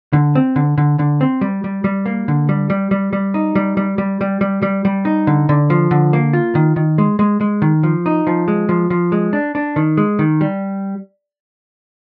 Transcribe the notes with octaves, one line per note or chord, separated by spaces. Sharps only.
D3
C4
D3
D3
D3
C4
G3
G3
G3
A#3
D3
G3
G3
G3
G3
D#4
G3
G3
G3
G3
G3
G3
G3
D#4
D3
D3
F3
D3
A#3
F4
D#3
D#3
G#3
G#3
G#3
D#3
F3
D#4
F3
G#3
F3
F3
G#3
D4
D4
D#3
G#3
D#3
G3